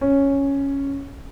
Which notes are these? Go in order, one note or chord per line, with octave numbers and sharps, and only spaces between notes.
C#4